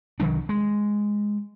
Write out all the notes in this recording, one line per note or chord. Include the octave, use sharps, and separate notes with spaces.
C2 D#3 F#3 D4
G#3